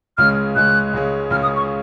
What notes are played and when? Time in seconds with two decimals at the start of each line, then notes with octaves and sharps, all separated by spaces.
0.18 C#2 C#3 G#3 C#4 F6
0.56 C#2 C#3 G#3 C#4 F#6
0.93 C#2 C#3 G#3 C#4
1.30 C#2 C#3 G#3 C#4 F6
1.43 D#6
1.56 C#6